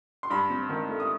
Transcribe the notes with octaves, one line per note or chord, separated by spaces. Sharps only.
C6
G2 B5
C4
D#3
A3
D#6